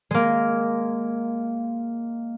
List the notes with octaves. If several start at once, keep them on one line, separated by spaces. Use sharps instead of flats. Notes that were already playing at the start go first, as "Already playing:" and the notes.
G#3 A#3